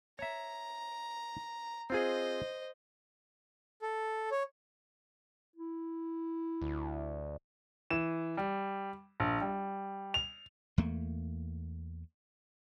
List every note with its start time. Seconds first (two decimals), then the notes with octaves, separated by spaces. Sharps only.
0.19 C#5 E5 A#5
1.90 C4 F4 G#4 C5 D#5
3.82 A4
4.31 C#5
5.56 E4
6.62 D2
7.91 E3 E7
8.37 G3
9.20 A#1
9.41 G3
10.14 F7
10.78 E2 A3 A#3